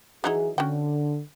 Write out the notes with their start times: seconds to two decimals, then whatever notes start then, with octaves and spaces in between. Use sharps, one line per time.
0.24 E3 F#3 D#4 E4 G#4
0.58 D3 C#4 F#4 G5